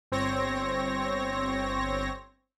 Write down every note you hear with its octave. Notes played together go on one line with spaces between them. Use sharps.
G1 C4 C#5 A#6